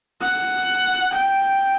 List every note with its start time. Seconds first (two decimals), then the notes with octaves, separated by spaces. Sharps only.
0.22 F#5
1.14 G5